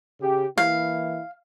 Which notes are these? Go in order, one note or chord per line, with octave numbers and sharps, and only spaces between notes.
C#3 G4
E3 A#3 E4 F5